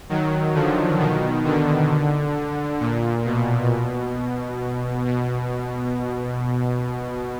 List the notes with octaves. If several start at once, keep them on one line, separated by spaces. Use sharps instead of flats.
D#3 F#3
D3 F3
B2 D#3
D3
A#2
B2
B2